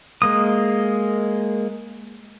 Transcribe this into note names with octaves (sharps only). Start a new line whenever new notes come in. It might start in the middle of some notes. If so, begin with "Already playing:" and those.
G#3 A#3 D#6